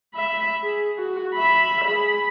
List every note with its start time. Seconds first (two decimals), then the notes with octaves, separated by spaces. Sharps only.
0.14 E5 B5
0.62 G#4
0.98 F#4
1.34 E5 B5
1.84 G#4 B5